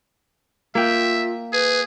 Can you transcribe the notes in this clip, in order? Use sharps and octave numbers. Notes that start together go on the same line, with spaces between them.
A#3 F4 E5 G5
G#4 B4